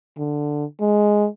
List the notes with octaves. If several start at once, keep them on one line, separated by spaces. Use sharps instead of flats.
D3
G#3